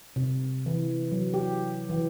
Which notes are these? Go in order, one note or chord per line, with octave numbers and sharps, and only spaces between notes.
C3
E3
F#3
G4
E3